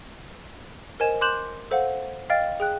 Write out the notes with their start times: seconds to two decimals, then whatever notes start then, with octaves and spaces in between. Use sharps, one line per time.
1.00 A#4 C5 D#5 G#5 G#6 E7
1.21 C6 D6 F#6 G6 E7 F#7
1.71 A4 C5 F5 F#5
2.30 D#5 F5 G5 F6 A6 D7
2.60 G#4 G5 F#6